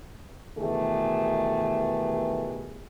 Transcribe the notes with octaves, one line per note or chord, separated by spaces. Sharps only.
B2 D#3 E3 A3 G4 G#4